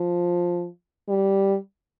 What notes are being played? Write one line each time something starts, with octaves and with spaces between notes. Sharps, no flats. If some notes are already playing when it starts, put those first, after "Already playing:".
Already playing: F3
G3